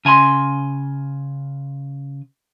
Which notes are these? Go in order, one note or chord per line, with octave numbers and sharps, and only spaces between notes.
C#3 G#5 A#5 C6